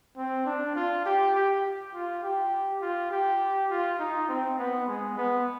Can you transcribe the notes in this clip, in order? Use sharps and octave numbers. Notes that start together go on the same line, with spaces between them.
C4
D4
F4
G4
G4
F4
G4
F4
G4
F4
D#4
C4
B3
G#3
B3